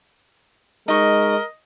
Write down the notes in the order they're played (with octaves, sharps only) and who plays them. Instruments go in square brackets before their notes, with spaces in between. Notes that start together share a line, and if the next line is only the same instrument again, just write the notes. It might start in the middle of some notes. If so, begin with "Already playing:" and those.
[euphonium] G#3 [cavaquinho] D#4 C#6 [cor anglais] A#4 [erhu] D#5